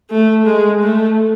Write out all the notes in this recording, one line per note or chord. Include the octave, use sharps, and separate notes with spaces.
A3
G#3
A3